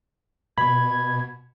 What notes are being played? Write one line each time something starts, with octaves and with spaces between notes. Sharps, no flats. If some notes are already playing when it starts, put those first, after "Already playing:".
B2 B5 G#6